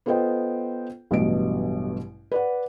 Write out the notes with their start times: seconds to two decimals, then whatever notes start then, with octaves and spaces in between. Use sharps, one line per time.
0.06 B3 F4 A4 C5 D#5 G5
1.11 A1 G2 B2 F#3 D#5 D7
2.32 B4 D5 F#5